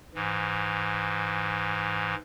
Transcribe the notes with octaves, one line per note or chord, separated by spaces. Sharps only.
G#2 E3